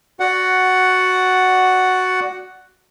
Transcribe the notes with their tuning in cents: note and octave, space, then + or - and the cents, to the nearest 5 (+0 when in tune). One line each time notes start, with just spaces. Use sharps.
F#4 +0 D5 +0 F#5 +5